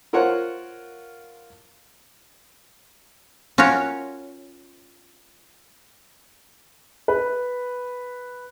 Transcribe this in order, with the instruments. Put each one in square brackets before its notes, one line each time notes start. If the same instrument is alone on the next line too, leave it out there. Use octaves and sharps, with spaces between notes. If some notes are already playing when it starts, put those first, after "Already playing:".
[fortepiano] F4 A#4 C5 C#5 F#5
[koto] C#4 F4 F#4 A#4 C#5
[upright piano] B4